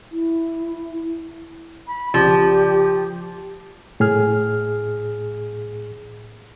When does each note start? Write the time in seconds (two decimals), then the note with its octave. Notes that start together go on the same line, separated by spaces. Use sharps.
0.11 E4
1.87 B5
2.14 B1 C#3 F3 G4 D5
4.00 A2 G#4 F6